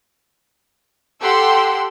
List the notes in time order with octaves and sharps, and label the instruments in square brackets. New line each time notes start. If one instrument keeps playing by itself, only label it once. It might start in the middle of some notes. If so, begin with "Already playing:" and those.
[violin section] G4 A4 F#5 C6 E6